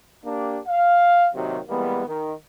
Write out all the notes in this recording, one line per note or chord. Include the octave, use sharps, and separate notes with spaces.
A#3 D4 G4
F5
D#2 C3 D#3 F#3
E3 G3 G#3 A#3 B3
D#3